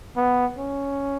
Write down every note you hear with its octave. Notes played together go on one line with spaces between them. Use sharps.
B3
C#4